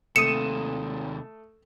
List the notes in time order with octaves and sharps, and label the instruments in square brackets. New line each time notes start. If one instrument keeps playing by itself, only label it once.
[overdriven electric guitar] D#2 C3 [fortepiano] A3 D#6 [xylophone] C#7 [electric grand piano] D#7 E7